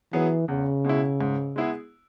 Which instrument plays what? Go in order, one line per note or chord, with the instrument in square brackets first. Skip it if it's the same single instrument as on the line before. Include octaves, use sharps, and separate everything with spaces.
[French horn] E3 [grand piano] F#3 B3 G#4
[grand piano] E2 [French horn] C#3
[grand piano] B2 G#3 E4
G#2
G#3 B3 E4 G#4